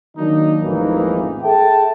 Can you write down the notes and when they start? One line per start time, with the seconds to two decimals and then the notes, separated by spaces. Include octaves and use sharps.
0.17 D#3 F#3 A#3 D4 D#4
0.62 A1 F2 G#2 E3 A#3 D#4
1.43 G#4 A4 E5 G5 A5